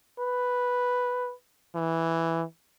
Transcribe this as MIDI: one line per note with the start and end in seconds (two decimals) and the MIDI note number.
0.20 1.33 71
1.75 2.43 52